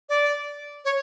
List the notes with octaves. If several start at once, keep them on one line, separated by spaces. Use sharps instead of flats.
D5
C#5